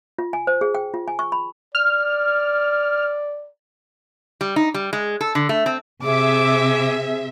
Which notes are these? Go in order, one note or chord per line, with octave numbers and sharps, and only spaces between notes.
F4
G#5
C5
G#4
G5
F4
G#5
C#6
B5
D5 F6
G3
D#4
G3
G#3
A4
D3
A3
C4
C3 G#4 E5 D6